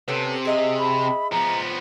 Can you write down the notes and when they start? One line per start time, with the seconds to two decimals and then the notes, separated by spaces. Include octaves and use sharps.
0.08 C3 B3 C#4 A4
0.45 G#4 D#5 E5
0.79 B5
1.32 F3 B3 A#5